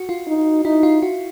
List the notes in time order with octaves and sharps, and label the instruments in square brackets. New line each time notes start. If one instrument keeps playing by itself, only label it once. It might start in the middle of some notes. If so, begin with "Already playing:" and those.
Already playing: [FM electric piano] F#4
F4
[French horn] D#4
[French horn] D#4 [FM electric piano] E4
[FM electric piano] F4
F#4